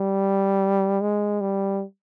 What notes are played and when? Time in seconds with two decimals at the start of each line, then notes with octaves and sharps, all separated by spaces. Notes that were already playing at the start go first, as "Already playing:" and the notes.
Already playing: G3
1.01 G#3
1.41 G3